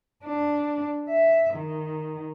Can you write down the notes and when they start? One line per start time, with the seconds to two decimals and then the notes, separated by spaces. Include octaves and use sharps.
0.25 D4
1.09 E5
1.54 D#3